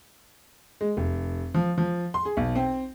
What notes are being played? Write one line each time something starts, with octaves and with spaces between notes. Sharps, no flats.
G#3
F1
F3
F3
C6
G#4
B1
C4